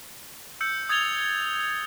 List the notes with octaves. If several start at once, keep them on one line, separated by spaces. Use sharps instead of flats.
E6 G6 C#7
D#6 G#6 A6 F7 G7